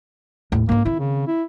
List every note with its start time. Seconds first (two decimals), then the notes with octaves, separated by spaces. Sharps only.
0.52 D#2 A2
0.69 G#2 A#3 D4
0.85 D#3 C4 E4
0.99 C#3
1.28 E4